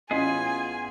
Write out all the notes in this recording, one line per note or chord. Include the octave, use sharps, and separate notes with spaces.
A1 B3 C#4 F4 G#4 D#5 G#5